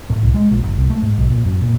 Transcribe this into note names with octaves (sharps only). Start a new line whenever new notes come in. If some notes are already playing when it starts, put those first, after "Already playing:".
A2
C2
G#3
A#1
F#1
C2
A3
G#2
B1
A#2
F#2
A#2